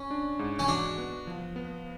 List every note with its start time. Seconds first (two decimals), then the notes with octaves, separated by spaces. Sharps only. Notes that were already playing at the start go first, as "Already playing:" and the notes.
Already playing: C#4
0.11 D4
0.39 G#2
0.59 C#4
0.68 D4 F#4
0.98 B3
1.27 F3
1.56 B3